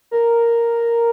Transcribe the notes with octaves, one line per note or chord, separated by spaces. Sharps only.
A#4